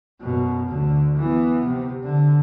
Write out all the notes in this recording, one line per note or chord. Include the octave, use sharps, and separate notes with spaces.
F#2 B2
D2 D3
E3 B3
C3
D3